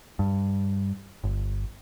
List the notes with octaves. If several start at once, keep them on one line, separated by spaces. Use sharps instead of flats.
G2
G1